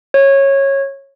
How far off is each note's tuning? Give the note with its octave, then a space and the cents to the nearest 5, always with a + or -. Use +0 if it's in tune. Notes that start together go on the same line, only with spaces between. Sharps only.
C#5 -15